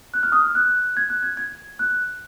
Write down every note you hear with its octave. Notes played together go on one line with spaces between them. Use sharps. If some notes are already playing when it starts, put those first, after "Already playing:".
F#6
F6
D#6
F6
F#6
G#6
F#6
G#6
G#6
F#6